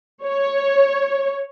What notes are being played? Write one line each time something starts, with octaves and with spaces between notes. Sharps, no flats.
C#5